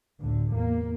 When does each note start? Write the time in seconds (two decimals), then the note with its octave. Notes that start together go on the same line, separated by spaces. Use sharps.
0.21 G1 D2 A2 D3
0.53 E2 A#3